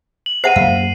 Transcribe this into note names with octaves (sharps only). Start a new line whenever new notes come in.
F#7
C5 E5 F#5 C7 D#7
F#2 A#3 F5